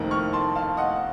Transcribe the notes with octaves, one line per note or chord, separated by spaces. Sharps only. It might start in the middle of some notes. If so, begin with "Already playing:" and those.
Already playing: F1 F2 D#3 A#3
C#6 F6
A5 C6
F5 A5
D#5 F#5